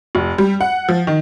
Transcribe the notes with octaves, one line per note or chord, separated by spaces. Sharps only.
F1
G3
F#5
F3
D#3